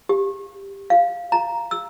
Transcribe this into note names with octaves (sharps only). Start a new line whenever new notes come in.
G4
F5
A#5
E6